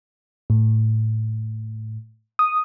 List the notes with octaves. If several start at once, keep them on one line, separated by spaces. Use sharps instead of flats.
A2
D#6